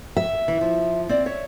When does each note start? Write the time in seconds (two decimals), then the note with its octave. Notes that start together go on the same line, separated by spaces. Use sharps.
0.17 E5
0.48 E3
0.61 F3
1.09 C4 D5
1.26 C#5 E5